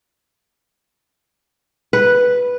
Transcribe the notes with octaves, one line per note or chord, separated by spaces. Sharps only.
B4